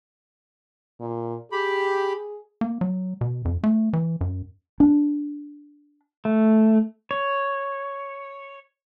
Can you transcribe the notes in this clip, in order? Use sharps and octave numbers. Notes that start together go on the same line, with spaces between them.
A#2
G4 G#4 B5
A#3
F#3
B2
F2
A3
E3
F#2
D4
A3
C#5